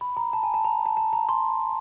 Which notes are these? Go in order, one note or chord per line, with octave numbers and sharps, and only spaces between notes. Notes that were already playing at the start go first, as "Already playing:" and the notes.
B5
A#5
A5
G#5
A5
A#5
A5
A5
A#5
C6